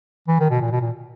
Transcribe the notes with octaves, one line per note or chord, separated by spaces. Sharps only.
E3
D#3
B2
A#2
B2
A#2